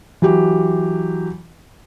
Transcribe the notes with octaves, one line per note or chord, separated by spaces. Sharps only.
E3 F#3 G4